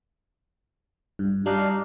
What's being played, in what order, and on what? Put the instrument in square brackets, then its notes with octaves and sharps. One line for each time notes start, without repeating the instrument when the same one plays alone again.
[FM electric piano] G2
[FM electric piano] G3 [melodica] D4 D#4 F5